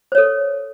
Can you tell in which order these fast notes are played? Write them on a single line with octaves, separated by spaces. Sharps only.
C5 C#5 A4